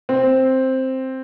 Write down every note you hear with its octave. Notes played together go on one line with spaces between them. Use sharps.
C4